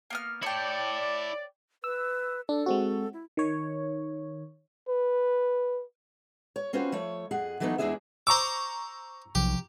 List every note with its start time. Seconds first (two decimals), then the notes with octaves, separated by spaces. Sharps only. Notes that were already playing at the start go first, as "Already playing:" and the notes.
0.10 A#3 B3 F6
0.43 E4 C#5 D5 G5 A5
1.84 B4 E6
2.49 D4 A4
2.66 G#3 C4 F#4
3.13 E4
3.37 D#3 C#5
4.88 B4
6.56 C#5
6.73 C4 C#4 F4 F#4 B4 C5
6.92 F3 A3 C#5
7.31 F2 G#4 F#5
7.60 E3 F#3 A3 B3 D4 D#4
7.78 E2 G#3 D4 E4 G#4 E5
8.27 C5 A#5 C#6 D6 E6
9.35 B1 C3 F3 G4